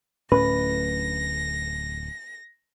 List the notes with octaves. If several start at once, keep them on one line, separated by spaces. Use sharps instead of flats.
D1 A2 C#4 B4 A#6